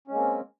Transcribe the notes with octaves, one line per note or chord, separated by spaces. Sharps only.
G#3 A#3 C4 C#4